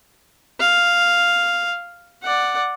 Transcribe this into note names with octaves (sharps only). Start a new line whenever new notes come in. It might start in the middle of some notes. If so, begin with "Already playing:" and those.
F5
D5 F#5